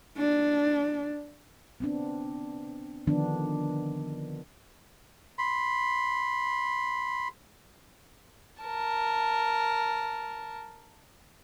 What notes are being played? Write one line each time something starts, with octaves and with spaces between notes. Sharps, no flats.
D4
B3 C4 D4
D3 D#3 F3 B3 D4
B5 C6
A#4 A5